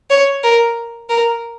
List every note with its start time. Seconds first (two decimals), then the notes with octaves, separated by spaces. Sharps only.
0.10 C#5
0.43 A#4
1.10 A#4